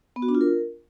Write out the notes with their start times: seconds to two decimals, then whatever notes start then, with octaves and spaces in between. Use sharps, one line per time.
0.16 B3
0.22 F#4
0.28 D4
0.35 F4
0.41 A#4